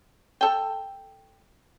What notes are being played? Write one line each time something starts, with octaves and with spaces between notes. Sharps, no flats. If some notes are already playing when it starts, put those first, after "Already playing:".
A4 G5